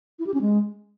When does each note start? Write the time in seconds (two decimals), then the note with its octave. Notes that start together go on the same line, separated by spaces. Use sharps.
0.19 E4
0.27 G4
0.34 C#4
0.41 G#3